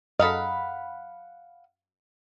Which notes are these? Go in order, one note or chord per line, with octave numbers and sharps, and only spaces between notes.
F#2 A4 D#5 F5 F#5 B5